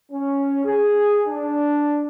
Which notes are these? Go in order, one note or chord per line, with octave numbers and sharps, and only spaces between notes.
C#4
G#4
D4